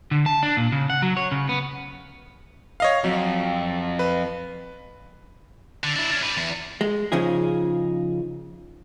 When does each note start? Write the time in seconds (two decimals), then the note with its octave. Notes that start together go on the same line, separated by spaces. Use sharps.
0.11 D3
0.26 A5
0.43 D4
0.57 A#2
0.72 C#3
0.90 F#5
1.02 F#3
1.17 C#5
1.32 C#3
1.49 B3
2.80 C#5 D#5 F5
3.04 F2 F#3
3.99 B4
5.84 D3
5.96 D4 E4
6.11 C#4 D4
6.23 B4 D5
6.37 E2
6.81 G#3
7.12 C#3 F3 D#4 G#4